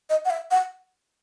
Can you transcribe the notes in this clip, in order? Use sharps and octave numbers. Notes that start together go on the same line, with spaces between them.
D#5
F#5
E5
F#5